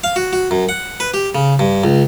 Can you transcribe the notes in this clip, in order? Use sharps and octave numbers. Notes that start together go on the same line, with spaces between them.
F5
F#4
F#4
F#2
F#5
B4
G4
C#3
G2
C#2